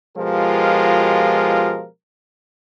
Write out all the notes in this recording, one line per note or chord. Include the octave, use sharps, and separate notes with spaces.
B2 F3 G#3 F4 G4 A#4